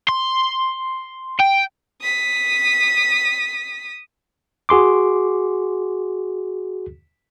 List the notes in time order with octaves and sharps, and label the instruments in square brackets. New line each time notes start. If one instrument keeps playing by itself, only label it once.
[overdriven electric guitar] C6
G5
[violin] D#6 B6
[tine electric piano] F#4 G#4 C6 D6